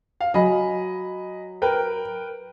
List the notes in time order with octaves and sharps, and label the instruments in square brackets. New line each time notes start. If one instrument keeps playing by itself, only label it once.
[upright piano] F5
[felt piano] F#3 [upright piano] D#5 G#5 B5
[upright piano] A#4 B4 G5